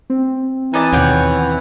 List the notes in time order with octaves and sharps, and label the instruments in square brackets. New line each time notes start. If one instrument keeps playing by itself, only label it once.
[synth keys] C4
[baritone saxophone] E3 [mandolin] D#4 D5 A5
[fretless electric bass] D#2 B2 [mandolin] C#5 F#5 G5